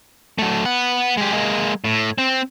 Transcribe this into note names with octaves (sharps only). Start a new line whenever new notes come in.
F#3 A3
B3 F#5
G#3 G4
G#3 A#3
A2
C4